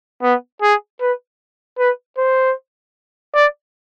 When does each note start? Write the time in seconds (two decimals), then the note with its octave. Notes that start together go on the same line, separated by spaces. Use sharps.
0.22 B3
0.62 G#4
1.01 B4
1.79 B4
2.18 C5
3.34 D5